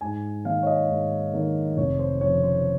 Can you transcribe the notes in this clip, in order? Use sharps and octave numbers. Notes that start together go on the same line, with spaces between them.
G#2 G#5
D#3 A#3 D#4 F5
C#5
D#5
G#2
D#3 A#3 D#4
F1 C#5
C5
F2 C#3 F3 C#5
C5